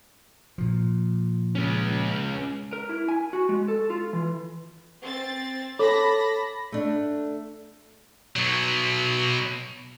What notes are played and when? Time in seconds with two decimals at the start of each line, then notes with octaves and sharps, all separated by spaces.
0.58 A#2 F3
1.55 G#3 C#4
2.73 A#4
2.89 E4
3.09 G#5
3.33 F#4
3.49 G#3
3.68 A4
3.90 F4
4.13 E3
5.02 C4 A6
5.79 A4 C#5 A5 B5 D6 A#6
6.72 A3 D4
8.36 B2 F#3